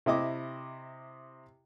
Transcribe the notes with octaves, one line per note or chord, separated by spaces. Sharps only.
C3 E4 D#5 D6